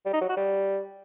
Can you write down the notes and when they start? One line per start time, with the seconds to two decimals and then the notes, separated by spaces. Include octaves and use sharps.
0.06 G3
0.13 D#4
0.21 F#3
0.29 F#4
0.37 G3